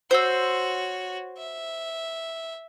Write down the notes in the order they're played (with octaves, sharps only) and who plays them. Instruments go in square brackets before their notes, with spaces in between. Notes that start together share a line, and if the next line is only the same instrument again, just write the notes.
[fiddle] F#4 C#5 [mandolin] C5 E6
[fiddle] E5